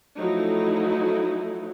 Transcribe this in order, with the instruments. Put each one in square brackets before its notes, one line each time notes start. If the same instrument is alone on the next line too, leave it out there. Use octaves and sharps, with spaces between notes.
[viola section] F3 F#3 A3 D#4 E4